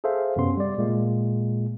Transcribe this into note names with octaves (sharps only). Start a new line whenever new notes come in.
G#4 A4 C5 E5 F5
F#2 C3 B3 C#4 C6
G3 D5
A#2 G#3 A#3